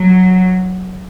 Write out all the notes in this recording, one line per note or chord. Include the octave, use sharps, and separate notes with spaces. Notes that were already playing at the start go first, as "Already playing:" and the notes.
Already playing: F#3